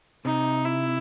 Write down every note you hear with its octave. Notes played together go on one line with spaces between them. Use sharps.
C3 D#4
E4